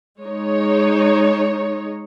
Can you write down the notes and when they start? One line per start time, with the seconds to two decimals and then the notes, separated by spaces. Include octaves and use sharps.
0.23 G#3 D#4 C#5